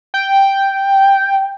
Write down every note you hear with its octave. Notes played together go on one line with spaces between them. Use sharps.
G5